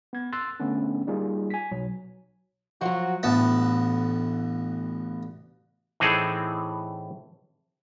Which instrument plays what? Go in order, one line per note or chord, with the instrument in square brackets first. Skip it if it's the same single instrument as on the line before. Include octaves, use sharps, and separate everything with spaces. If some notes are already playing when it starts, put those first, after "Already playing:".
[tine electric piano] B3 G#6
C6 E6 F#6 A6
D3 A3 B3 C#4 D4
G3 A#3 D#4 F4 G#4
G#5 B6
B1 F#3
[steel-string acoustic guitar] F3 F#3 [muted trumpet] F#4
[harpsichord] A1 D2 B3 A5
[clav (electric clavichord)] A2 E3 C4 D#4 G#4 A4